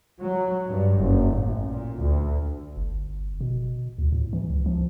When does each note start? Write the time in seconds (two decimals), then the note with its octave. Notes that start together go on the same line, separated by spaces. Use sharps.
0.22 F#3
0.68 G2
1.00 F#1
1.32 A1
1.69 A#2
2.00 D2
2.77 G1
3.41 B2
3.98 D2
4.12 A2
4.33 E3
4.50 C#2
4.66 F3